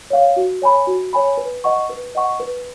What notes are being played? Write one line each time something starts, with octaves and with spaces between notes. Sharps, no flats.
C#5 F5
F#4
C#5 G#5 B5
F#4
C#5 G#5 B5
B4
D#5 F#5 C#6
B4
D#5 F#5 C#6
B4